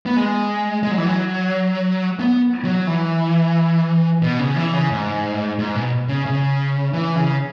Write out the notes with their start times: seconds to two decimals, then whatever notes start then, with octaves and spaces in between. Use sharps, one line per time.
0.06 B3
0.16 G#3
0.83 G#3
0.91 F#3
0.98 E3
1.05 F#3
2.19 B3
2.64 F#3
2.87 E3
4.22 B2
4.39 C#3
4.56 E3
4.73 C#3
4.91 G#2
5.59 G#2
5.75 B2
6.08 C#3
6.26 C#3
6.93 E3
7.16 C#3